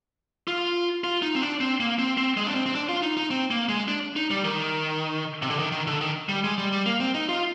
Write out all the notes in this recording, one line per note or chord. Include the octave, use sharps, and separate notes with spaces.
F4
F4
D#4
C4
D4
C4
A#3
C4
C4
G#3
D4
C4
C4
D4
F4
D#4
D#4
C4
A#3
G#3
D4
D#4
G3
D#3
C3
D3
D#3
D#3
D3
D#3
G3
G#3
G3
G3
A#3
C4
D#4
F4